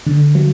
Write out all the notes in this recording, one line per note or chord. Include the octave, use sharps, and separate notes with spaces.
D3
F#3